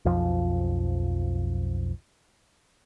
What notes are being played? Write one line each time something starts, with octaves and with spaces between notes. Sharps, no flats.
B1 F2 F3